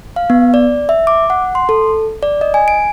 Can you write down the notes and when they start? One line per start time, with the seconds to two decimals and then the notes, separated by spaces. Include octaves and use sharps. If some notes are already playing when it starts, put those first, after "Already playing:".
0.16 F5
0.30 B3
0.54 D5
0.89 E5
1.07 D6
1.30 F#5
1.55 C6
1.69 A4
2.23 D5
2.41 D#5
2.54 G#5
2.68 D7